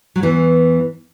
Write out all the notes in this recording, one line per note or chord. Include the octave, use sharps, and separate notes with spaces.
F#3
E2 E3